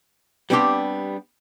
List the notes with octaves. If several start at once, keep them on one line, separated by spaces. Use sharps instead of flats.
G3 B3 C4 D4 G4 C6